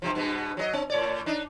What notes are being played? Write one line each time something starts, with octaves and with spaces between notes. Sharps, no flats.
G2 C3 F3
G2 B2 B3
F#3 C#4 D#5
C4
A2 C#5 D5
D4 D#4